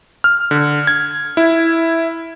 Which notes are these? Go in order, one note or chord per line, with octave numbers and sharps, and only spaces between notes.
F6
D3
G#6
E4